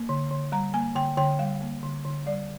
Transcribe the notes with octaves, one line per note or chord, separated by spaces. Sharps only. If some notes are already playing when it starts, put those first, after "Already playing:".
Already playing: A#3
D3
D3
G3 A#5
A#3 G#5
D3 G5
D3 G5
G3 F5
A#3
D3
D3
G3 D5